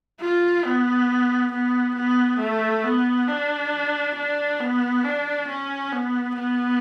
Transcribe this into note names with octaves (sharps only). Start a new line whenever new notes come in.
F4
B3
B3
B3
A3
B3
D4
D4
B3
D4
C#4
B3
B3